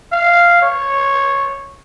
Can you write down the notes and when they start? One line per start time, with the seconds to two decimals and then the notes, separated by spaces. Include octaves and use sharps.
0.12 F5
0.62 C#5